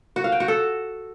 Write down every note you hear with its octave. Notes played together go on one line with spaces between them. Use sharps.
F#4
F5
G5
F#4
A4